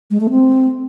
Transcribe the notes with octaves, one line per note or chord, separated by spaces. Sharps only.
G#3
A3
C4